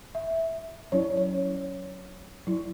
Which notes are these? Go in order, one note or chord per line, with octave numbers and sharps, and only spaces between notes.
E5
F#3 C#4 E4 C#5
C#5
F#3 E4